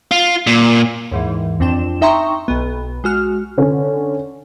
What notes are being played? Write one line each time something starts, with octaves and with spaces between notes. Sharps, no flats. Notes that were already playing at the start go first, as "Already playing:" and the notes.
F4
A#2
D#2 G#2 E3
F2 C4 D4 G5 E7
D#4 E5 G5 A#5 C6 C#6
B1 B3
G#3 F#4 F6
D3 C#4